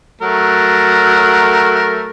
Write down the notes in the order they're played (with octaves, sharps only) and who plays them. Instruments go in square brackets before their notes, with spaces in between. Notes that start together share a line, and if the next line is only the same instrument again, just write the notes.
[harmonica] F#3 A3 A#4